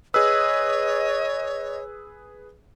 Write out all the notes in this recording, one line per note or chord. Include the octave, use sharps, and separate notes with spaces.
G#4 B4 C#5 D#5 E6